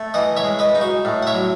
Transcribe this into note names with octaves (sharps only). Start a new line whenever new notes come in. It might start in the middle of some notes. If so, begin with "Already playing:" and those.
Already playing: A3
E3 D#5 F#5
C#5 E5
G#3
B4 D#5
D#4
F#4
A2
F#5
C#5 E5
F#3